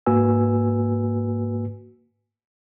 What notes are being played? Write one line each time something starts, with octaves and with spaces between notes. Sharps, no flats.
G#2 A#3 F#4 B4 G#5 E6